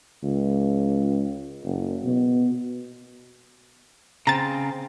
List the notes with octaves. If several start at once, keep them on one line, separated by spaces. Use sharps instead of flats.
C#2
F#1
B2
C#3 C4 A#5 A6